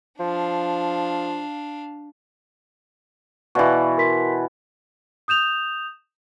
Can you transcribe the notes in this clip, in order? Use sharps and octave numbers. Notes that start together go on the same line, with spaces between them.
F3 D4 F5
B2 E3 D5 F5 C#6
A#4 C6 B6
D#6 G6 E7 F7